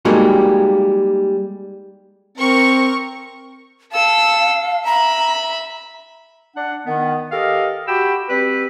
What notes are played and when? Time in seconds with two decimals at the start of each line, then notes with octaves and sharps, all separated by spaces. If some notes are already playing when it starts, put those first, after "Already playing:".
0.05 G3 G#3 A#3 D#4 F#4 A4
2.38 C4 A#4 C#6
3.93 A4 F5 E6
4.85 E5 A#5 B5
6.56 D4 F#5
6.86 D#3 B3
7.32 G4 A4 A#4 D#5 F5
7.88 F#4 G4 G5 B5 E6
8.29 G3 C4 B4